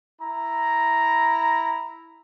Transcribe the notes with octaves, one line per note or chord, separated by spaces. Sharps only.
E4 A#5